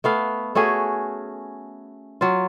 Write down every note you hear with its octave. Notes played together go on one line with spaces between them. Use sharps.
A3 B3 F5
A3 C#4 F#4 G#4
F#3 F4